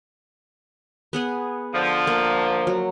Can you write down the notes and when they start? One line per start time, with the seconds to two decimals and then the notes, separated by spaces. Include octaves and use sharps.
1.13 B3 G#4 F#5
1.73 D3 F3
2.07 A#3
2.67 F#3